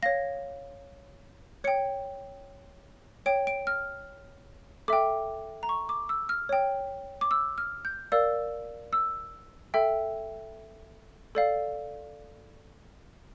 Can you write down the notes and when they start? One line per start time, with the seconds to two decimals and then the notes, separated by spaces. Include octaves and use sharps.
0.03 C#5 F5 A#6
1.64 C#5 G5 C#7
3.26 C#5 G5 D7
3.47 D7
3.67 F6
4.88 A4 E5 G5 D6
5.63 A#5
5.69 C#6
5.89 D6
6.09 E6
6.29 F6
6.49 C#5 G5
7.21 D6
7.31 E6
7.58 F6
7.85 G6
8.12 A#4 D5 F5 E6
8.93 E6
9.74 A4 E5 G5
11.35 A4 D5 F5